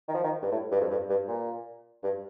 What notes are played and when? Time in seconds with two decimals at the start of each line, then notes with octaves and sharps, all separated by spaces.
0.08 D#3
0.15 F3
0.23 D#3
0.42 G2
0.52 A2
0.71 G2
0.81 F2
0.91 G2
1.09 G2
1.28 A#2
2.04 G2